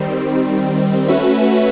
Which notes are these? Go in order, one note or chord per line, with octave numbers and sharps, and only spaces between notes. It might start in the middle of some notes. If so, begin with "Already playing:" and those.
Already playing: D#3 G3 C4
A3 C#4 F#4 B4 E5